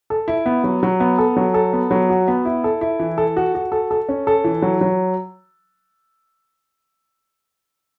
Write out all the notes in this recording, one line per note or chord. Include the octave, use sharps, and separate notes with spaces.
A4
E4
B3
F#3
F#3
B3
A4
F#3
A4
B3
F#3
F#4
B3
E4
A4
E4
E3
A4
F#4
F#4
A4
A4
C#4
A4
E3
F#3
F#3